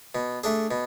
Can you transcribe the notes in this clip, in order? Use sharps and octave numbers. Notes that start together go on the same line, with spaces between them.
B2
A3 D4 G#4
B2